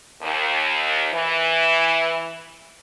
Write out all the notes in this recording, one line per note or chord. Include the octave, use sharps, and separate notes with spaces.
D#2
E3